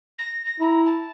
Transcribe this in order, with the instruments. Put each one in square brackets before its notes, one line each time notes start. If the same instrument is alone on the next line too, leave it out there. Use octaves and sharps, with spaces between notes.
[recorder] A#6
A#6
[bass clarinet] E4 [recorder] A#5
[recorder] A5